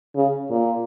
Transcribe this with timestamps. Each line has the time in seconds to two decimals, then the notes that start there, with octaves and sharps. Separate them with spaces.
0.16 C#3
0.50 A#2